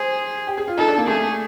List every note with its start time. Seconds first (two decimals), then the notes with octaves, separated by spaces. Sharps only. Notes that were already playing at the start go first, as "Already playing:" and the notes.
Already playing: G#4 C5
0.47 G4
0.57 G#4
0.68 F4
0.78 D#4 A4
0.88 D4
0.98 A#3
1.07 A3 G#4